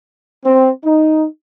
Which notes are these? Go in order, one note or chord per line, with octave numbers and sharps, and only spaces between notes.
C4
D#4